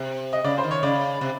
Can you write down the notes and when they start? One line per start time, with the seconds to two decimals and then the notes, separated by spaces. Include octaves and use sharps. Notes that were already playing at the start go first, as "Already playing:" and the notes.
Already playing: C3
0.33 D#5
0.44 C#3 D5
0.58 C5
0.64 D#3
0.71 C#5
0.83 C#3 D5
1.21 C3